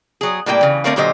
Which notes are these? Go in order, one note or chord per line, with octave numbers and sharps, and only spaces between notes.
F#3 G#4
A2 G3 A#3 F4 G5
C#3 E3
D3 A3 C4 A#4 C#5 F5
A#2 D3 F#3 G4 C5 D#5